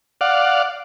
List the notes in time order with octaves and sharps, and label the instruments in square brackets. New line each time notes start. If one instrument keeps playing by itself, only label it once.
[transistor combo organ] D5 F5 F#5